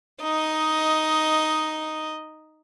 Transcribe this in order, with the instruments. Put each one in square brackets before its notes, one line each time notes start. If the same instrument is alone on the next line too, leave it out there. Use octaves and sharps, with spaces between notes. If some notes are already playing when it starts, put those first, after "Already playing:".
[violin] D#4 D#5